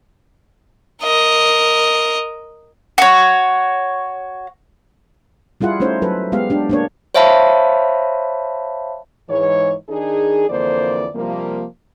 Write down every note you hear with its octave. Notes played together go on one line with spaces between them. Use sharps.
A#4 D#5
F#4 C#5
G3 E4 F4 G#4 F#5
A3 C#4 D#4 C5 C#5
F#3 A4 B4
G#3 B3 G4 F5
D4 G4
A#3 D4 C#5
C5 C#5 E5 F5 A5 B5
G#2 E3 C#5
D#3 D4 D#4 G#4
F2 D3 E3 A#3 C5 D5
C3 F3 G3 A#3